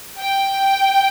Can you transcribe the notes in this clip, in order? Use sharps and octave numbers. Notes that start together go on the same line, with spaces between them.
G5